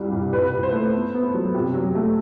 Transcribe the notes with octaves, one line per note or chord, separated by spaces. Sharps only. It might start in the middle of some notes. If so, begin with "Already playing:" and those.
Already playing: C2 G2 G3
C2
C2 B4
C2
C5
A3
B3
B3
F#3
C3
F#3
A3